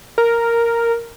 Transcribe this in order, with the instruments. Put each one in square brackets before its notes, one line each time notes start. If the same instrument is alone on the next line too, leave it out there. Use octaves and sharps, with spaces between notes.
[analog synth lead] A#4